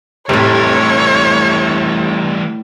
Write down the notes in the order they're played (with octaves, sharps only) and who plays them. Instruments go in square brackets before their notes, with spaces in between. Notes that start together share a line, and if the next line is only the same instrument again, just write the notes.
[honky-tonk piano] F1 [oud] A2 G4 [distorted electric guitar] E3 G3 [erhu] C#5